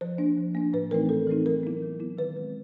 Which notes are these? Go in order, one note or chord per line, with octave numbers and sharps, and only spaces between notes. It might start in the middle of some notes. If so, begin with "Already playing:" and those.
F3 C5
A#3 D4
F3
A#3 D4
A2 B4
E3 A3 C4 D#4 A#4
A2 A4
E3 A3 C4 D#4
F#3 A#4
B3 E4
F#3
B3 E4
D#3 B4
G#3 C4